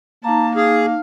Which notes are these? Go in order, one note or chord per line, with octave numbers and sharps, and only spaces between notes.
A#3 D#4 A5 A#5
D#4 G#4 F5